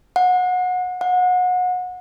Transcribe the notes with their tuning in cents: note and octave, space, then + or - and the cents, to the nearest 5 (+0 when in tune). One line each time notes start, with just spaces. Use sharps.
F#5 -25
F#5 -30